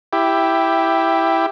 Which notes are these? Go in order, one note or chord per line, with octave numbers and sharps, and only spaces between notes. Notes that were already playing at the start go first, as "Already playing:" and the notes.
E4 G4